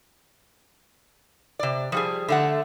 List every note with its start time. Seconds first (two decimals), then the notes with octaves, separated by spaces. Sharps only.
1.59 C3 D5
1.92 F3 G3 G#4
2.28 D3 A3 F#5